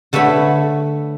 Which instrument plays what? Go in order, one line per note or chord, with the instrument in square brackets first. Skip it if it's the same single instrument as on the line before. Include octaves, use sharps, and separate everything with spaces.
[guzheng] D3 A3 B4 C#5 B5